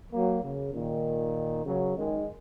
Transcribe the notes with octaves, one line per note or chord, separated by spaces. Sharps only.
F#3 A#3
C#3
A#2 D#3
C#3 F#3
D#3 G#3